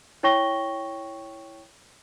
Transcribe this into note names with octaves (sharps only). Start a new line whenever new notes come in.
E4 C#5 G5 C#6 A#6 G7